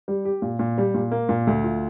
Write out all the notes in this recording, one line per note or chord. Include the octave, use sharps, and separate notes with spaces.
G3
G4
A#2
A#2
G3
A#2
A#3
A#2
D2
F4